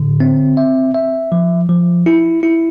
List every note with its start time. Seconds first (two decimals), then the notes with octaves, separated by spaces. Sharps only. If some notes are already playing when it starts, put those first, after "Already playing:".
Already playing: A2 D3
0.20 C4
0.57 E5
0.94 E5
1.32 F3
1.69 F3
2.06 E4
2.43 E4